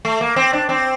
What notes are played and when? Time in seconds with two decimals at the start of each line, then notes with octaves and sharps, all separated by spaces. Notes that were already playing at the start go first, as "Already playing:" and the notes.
0.05 A3
0.21 A#3
0.36 C4
0.53 D4
0.69 C4